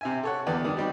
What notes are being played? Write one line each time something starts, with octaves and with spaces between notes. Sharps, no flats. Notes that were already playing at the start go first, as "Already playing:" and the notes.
C3 E5 G#5
A4 C#5 F#5
E2 B3 D4 G4 D5 G5
G2 D#3 D5 D#6
G3 C4 D#4 F#4 G4